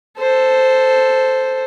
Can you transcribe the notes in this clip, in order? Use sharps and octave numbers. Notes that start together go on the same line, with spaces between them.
A4 C5